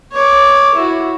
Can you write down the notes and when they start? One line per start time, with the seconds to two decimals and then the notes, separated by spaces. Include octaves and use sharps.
0.12 C#5 D6
0.75 E4 F#4